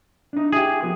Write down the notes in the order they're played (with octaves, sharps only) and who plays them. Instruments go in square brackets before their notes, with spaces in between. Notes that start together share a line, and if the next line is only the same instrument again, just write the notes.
[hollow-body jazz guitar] D4 D#4
[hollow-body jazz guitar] E4 G4 [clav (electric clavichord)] G#4
[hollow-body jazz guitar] F3 A#3 B3